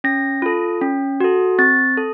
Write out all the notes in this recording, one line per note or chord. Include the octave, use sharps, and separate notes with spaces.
C#4 A#6
F4 A4
C#4
F#4 A4
C4 A6
A4